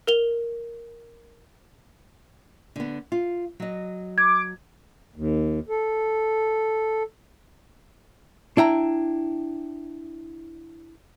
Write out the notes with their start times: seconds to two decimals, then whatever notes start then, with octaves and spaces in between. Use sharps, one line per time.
0.07 A#4 F7 G7
2.76 D3 B3
3.12 F4
3.60 F#3 D#5
4.18 D6 G#6
5.16 D#2
5.69 A4
8.57 D4 E4 G5 A#5